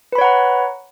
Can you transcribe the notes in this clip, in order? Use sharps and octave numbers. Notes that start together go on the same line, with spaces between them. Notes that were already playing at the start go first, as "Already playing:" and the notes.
B4 C#5 F#5 A#5 B5